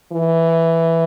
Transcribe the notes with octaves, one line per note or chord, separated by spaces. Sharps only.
E3